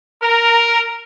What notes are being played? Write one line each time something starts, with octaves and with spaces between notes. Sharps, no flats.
A#4